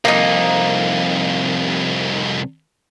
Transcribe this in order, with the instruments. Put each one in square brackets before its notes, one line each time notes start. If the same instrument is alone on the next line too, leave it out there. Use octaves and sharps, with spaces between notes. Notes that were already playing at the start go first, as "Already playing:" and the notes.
[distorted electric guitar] C2 F2 [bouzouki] A#3 D#4